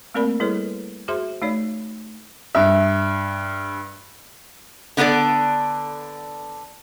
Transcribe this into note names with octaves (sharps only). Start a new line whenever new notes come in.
A3 A#3 C4 A#4 D5 B5
G3 E4 G#4 A4 B4 C#5
F#4 G#4 C5 E5 C6
A3 D#4 C#5 D5
G2 E5
D3 B3 D4 A4 D5